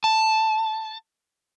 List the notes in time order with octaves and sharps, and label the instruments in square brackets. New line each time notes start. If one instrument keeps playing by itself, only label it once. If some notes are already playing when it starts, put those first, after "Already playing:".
[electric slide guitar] A5